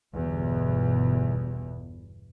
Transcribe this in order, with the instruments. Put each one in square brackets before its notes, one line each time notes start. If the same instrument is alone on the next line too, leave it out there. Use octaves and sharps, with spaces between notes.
[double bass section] G1 E2 B2